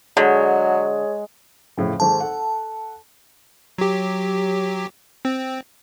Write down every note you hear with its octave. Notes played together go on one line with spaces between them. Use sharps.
D3 F#3 G#3 G#4 C#5
F2 A2 C#3
G#1 G#2 A4 A5
A4 F#5
F#3 G4
C4